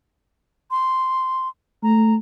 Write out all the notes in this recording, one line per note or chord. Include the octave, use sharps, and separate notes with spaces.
C6
A3 A#5